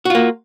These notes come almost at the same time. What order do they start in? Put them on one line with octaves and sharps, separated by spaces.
F#4 F4 A#3